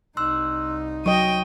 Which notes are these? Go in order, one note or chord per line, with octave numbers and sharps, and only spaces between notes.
C2 D#4 C6 E6 F#6
F#3 D#5 G5 C#6 D#7